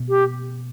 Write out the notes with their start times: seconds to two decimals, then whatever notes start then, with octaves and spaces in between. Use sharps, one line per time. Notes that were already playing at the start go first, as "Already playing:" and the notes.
Already playing: B2
0.09 G4